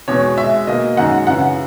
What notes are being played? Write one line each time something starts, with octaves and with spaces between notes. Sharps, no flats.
E2 B2 G#3 C#5
B2 G#3 E5
B2 A#3 D#5
F#2 D#3 G#3 F#5
F#2 C#3 E3 F#5